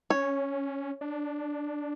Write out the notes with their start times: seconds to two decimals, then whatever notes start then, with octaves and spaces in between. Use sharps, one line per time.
0.10 C#4 C#5
1.01 D4